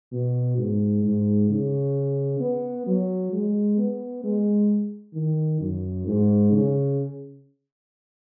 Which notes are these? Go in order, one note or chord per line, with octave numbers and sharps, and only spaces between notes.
B2
G#2
G#2
C#3
B3
F#3
G#3
B3
G#3
D#3
F#2
G#2
C#3